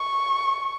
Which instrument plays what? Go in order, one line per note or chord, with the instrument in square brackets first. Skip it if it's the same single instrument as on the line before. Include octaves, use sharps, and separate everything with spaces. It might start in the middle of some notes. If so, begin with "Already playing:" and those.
Already playing: [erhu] C#6